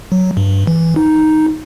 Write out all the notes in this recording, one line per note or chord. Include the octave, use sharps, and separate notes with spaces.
F#3
G2
E3
D#4